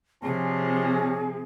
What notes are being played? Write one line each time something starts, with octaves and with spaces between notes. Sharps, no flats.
C3 F3 C#4 D4 G#4 A5